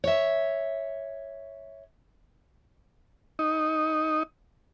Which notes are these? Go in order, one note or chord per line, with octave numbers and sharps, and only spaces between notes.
C#5 E5
D#4